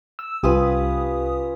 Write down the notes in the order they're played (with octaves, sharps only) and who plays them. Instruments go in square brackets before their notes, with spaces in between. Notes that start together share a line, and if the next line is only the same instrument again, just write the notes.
[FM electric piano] E6
[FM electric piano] C2 G4 D#6 [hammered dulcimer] C#4 F4 B4